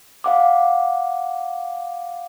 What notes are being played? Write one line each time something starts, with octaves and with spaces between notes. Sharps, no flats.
F5 F#5 D6